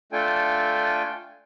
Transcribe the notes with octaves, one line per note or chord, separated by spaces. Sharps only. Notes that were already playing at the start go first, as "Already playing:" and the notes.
A3 D4 F4 A4 G5 G#5